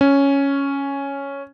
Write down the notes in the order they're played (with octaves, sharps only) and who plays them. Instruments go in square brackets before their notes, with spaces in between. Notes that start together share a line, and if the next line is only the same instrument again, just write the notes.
[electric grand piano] C#4